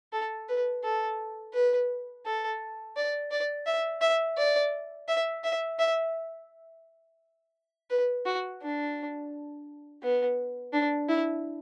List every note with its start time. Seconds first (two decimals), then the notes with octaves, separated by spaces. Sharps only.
0.13 A4
0.49 B4
0.84 A4
1.54 B4
2.26 A4
2.96 D5
3.31 D5
3.66 E5
4.01 E5
4.37 D5
5.08 E5
5.44 E5
5.79 E5
7.90 B4
8.26 F#4
8.62 D4
10.03 B3
10.73 D4
11.08 E4